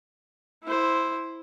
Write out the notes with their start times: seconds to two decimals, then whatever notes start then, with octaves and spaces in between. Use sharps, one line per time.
0.64 E4 C5